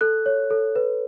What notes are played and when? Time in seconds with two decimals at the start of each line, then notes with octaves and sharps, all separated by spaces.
0.01 A4 F#6
0.26 C#5
0.50 A4
0.76 B4